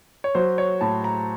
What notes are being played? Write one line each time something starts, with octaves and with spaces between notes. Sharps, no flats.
C#5
F#3 C5
C#5
A2 A5
A#5